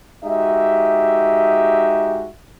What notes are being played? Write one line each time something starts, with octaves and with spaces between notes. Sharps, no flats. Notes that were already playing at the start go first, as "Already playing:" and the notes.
G#3 D#4 F#4 G4 E5